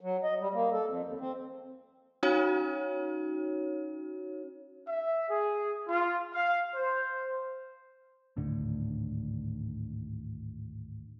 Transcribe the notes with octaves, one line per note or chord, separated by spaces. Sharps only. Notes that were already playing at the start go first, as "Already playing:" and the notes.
F#3
D#5
G3
A#3
A4
F2
D#2
C4
C#4 D#4 F#4 C#5
E5
G#4
F4
F5
C5
G#1 D2 A2 D3